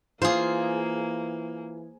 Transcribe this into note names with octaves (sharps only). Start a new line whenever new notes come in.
E3 A#3 F4 G#4 C5